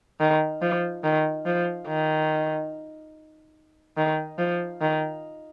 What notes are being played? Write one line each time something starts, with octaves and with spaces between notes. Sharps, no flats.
D#3
F3
D#3
F3
D#3
D#3
F3
D#3